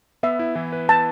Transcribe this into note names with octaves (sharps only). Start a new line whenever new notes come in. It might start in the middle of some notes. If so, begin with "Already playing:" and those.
B3 E5
E4
E3
B4
B3 A5